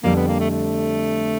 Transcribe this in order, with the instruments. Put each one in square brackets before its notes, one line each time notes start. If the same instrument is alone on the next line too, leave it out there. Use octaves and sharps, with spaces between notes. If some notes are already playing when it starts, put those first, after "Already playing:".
[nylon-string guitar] F2 D3 G3 [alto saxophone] A#3
[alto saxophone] B3
A#3
A3
A3